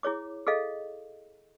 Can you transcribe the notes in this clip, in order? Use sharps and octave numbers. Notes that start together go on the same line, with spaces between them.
E4 G#4 C#5 D6
G#4 A4 D#5 F5